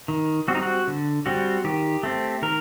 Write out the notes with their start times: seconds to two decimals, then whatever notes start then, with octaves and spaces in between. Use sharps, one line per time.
0.08 D#3
0.48 G3 C4 F#4
0.55 D#4
0.62 F#4
0.88 D3
1.26 G3 C4 F#4
1.64 D#3 G4
2.03 A3 C4
2.42 D#3 A#4